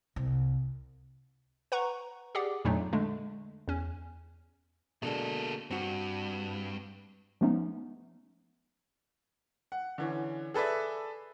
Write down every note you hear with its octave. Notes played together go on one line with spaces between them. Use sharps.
C2
B4 F#5 A#5 C#6
G4 G#4 D5 F#5
F2 A#2 F#3 A3 D4 D#4
D3 G#3 A3 D4
E2 C#4
B2 D3 G#3 A#3 A4
G2 C4 F#4
F3 G#3 A3 B3 C#4 D#4
F#5
D3 E3 C#4
G#4 A4 B4 D5 E5